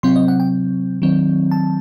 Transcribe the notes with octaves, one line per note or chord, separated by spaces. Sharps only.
C3 F#3 C4 C6
D#5
F#5
G5
D#3 F#3 C4
A5